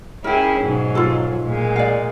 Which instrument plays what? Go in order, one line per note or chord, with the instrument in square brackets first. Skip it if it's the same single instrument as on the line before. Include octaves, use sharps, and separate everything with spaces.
[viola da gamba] C#4 E4 G#4 [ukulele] A#4 G5
[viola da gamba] G#2 B2 F#3
[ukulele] F4 A4
[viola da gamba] A#2 G#3
[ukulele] D5 F5